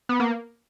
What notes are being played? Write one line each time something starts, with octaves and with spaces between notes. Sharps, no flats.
B3
A#3